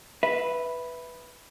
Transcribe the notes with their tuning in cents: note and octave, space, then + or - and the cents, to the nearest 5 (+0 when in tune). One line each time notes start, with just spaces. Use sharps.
B4 +0 E5 +0